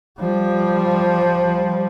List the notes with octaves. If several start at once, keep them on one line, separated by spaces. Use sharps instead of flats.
F3 G3